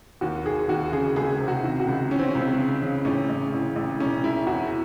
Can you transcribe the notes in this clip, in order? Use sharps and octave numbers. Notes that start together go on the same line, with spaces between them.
D#2 F#4
D#2 G#4
D#2 F#4
C#3 G#4
C#2 G#4
C3
F#4
D#3
F#4
C#2
E3 C#4
C4
C#4
C#2
C#3
C#3
A1 C#4
A1
A1
A1
E1 C#4
E1 E4
E2 F#4